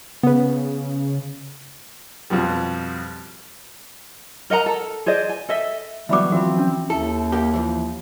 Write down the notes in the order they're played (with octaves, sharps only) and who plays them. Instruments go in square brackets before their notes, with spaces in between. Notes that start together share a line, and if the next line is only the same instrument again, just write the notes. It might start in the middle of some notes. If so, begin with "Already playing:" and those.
[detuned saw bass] C#3 [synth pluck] B3 B4
[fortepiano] F2 B2 F3 G3
[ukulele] A#4 D#5 F#5 A#5
A4
G#4 C5 D5 D#5
G#5
A4 D#5 E5
[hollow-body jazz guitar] D2 F#3 [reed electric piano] E3 B3 [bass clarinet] G3 [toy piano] E5 B5 D6
[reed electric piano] E3 F3 [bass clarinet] C4 [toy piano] F#4 B5
[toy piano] C#4
[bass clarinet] D#2 [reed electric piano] E4 E5 [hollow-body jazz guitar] A4
[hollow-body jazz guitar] A#3 G4
E3 F3